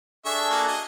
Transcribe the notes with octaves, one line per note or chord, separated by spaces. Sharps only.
D4 G#4 A4 E5 C#6
A#3 F#4
D#5